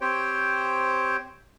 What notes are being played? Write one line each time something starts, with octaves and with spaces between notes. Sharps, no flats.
C4 G4 C5 C#5 G5